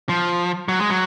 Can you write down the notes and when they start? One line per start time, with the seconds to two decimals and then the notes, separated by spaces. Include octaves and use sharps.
0.09 F3
0.69 F#3
0.79 G#3
0.90 F#3